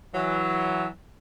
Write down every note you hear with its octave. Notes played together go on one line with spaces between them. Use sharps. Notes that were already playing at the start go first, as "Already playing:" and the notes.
E3 F#3